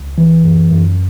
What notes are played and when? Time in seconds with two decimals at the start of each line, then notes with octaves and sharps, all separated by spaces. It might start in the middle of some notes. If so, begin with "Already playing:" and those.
Already playing: C#2
0.18 E3
0.44 F#2
0.71 F#2